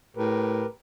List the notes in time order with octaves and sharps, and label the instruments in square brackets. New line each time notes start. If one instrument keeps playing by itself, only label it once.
[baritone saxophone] A2 [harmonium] G4 A#4 B4